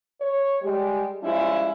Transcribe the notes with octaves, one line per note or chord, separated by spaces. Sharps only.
C#5
G3 G#3 G4
F3 G3 G#3 C#4 E4 F4